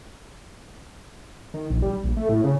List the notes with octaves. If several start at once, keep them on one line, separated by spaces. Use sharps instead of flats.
D#3
A#1
G3
A#1
A3
A2
C#3